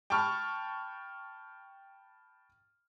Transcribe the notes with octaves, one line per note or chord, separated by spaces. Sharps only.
G5 A5 B5 C#6 F6